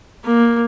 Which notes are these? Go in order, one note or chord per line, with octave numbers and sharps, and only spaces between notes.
A#3